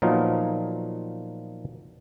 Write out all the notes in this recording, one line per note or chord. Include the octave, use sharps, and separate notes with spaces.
A#2 F3 F#3 B3 D#4 F4